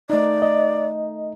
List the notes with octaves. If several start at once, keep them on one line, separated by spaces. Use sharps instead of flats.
A3 D#4 D5
D#5